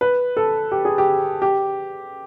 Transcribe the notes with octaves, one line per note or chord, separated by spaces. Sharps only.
B4
A4
G4
G#4
G4
G4